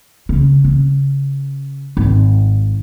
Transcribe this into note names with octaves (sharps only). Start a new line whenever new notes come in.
C#3
C#3
G#1